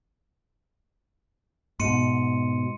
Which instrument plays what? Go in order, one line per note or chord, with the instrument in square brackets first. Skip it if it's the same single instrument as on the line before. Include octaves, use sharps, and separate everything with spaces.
[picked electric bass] G#2 B2 [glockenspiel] C6 C#7 D#7